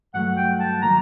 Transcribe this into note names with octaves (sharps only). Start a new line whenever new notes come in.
G2 F#3 A3 F#5
G5
A5
D#3 F#3 A#3 F#4 A#5